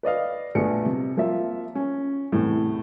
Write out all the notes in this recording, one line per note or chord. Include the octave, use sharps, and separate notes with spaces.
B4 D5 D#5 F5
A#1 A3 B3 C#7
C3
F3 A#3 F4 E5
C#4
E2 A2 C3